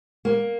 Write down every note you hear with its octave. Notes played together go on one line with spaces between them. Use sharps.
A#3